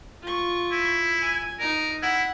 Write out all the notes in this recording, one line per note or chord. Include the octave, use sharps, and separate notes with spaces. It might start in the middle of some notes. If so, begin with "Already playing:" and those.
F4 C#6
E4
G#5
D#4 A#4
E4 F#5